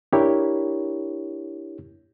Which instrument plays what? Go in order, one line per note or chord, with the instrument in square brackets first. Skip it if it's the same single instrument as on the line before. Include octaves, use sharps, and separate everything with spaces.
[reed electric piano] D4 E4 G4 A#4 C#5